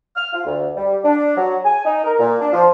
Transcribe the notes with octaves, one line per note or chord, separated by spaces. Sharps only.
F6
F4
D2
G3
D4
F#3
G#5
D#4
A#4
A#2
D4
F3